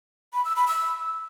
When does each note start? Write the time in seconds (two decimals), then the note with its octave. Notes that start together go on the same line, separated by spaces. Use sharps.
0.34 B5
0.45 E6
0.56 B5
0.67 E6